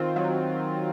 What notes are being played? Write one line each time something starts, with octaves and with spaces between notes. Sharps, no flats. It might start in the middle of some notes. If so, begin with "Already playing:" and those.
Already playing: D#3 C4 F4
F#3